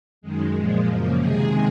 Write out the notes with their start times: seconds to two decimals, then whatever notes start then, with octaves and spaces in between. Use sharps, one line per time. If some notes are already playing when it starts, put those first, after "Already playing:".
0.21 F#2 D#3 G#3
0.54 A#2 F3 G#3
0.86 F#2 C#3 F3 A#3
1.17 C3 D#3 G#3 G#4